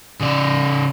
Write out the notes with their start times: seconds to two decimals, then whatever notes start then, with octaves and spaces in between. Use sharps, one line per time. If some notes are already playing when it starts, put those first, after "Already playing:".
0.20 C#3 D5